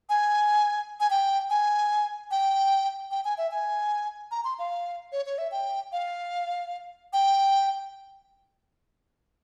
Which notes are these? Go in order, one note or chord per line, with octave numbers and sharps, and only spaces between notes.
G#5
G#5
G5
G#5
G5
G5
G#5
E5
G#5
A#5
C6
F5
C#5
C#5
E5
G5
F5
G5